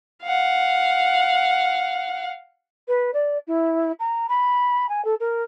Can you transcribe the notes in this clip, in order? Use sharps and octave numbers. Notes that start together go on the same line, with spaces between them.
F5 F#5
B4
D5
E4
A#5
B5
G#5
A4
A#4